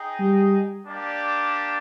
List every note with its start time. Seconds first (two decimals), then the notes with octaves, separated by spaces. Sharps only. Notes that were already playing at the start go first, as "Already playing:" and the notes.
Already playing: D#4 G#4 D#5 G5
0.20 G3
0.86 A#3 D4 G4 D5